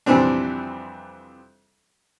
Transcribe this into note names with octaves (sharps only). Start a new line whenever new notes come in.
F2 C3 E3 G3 C4 D4